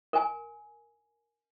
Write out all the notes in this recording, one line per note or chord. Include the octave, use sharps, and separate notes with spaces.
A#4 G#5